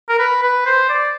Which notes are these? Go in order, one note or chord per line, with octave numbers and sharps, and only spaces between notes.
A#4
B4
B4
C5
D5